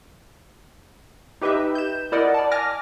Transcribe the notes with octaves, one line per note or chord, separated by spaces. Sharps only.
D#4 G4 B4 D#5 E5
G6 E7
E4 A#4 D5 D#5 F#5
D5 A5
G#5 D6 F6 A#6